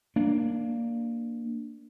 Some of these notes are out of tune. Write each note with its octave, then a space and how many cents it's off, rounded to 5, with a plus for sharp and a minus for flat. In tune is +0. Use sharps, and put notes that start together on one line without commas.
A#3 +0 D4 +5